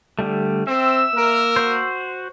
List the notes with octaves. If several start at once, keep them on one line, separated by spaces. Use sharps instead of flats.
D3 G3 A3
C4 E5 E6
A#3 A#4
F#4 C5